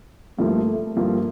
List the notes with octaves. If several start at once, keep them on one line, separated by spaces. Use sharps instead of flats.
G2 F3 A3 A#3
G2 F3 A#3